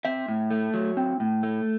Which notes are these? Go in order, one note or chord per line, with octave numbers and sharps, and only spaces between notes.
C4 E5
A2
A3
F#3
C4
A2
A3